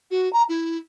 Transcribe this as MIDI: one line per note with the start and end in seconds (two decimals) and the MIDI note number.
0.10 0.31 66
0.33 0.43 82
0.49 0.77 64